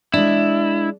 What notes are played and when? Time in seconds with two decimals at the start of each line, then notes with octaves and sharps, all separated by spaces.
0.14 G#3 D4 E4